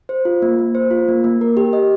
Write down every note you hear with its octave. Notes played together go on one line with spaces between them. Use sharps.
C5
F4
A#3
A#3
C5
F4
A#3
A#3
A#4
G4
D#5